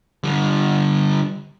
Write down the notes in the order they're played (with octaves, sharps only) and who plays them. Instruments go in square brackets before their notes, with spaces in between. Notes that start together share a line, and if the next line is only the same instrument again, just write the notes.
[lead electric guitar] D3 G3